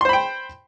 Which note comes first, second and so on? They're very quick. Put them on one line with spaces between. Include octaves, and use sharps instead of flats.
C6 C5 B5 G5